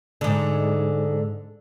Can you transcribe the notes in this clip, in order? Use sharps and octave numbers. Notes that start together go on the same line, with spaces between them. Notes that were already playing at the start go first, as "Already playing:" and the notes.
G#2 D3